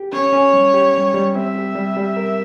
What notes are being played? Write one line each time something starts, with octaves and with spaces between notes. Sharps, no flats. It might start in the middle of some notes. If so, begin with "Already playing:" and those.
Already playing: G4
C#4 C#5
C#4
G3
G4
G3
G3
C4 E5
G4
G3
G3
A#4